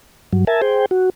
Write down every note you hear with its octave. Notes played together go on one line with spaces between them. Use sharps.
G2 F#3
A#4 E5 G#5 A5
G#4 C5 G5
F#4